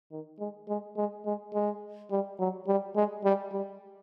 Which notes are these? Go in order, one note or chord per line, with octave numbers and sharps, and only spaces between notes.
D#3
G#3
G#3
G#3
G#3
G#3
G3
F#3
G3
G#3
G3
G3